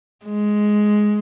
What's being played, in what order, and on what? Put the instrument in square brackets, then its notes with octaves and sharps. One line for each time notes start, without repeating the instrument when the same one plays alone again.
[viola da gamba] G#3